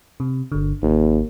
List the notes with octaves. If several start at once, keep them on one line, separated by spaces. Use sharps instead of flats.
C3
G1 D3
G#1 D#2